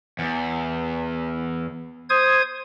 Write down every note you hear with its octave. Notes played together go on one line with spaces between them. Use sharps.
E2
C5 D#6 G#6